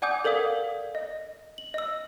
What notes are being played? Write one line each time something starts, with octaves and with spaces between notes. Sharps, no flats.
D5 F#5 G#5 D6 D#6 G6
A4 A#4 D5 F5 D#6
D#5
F#7
D#5 E6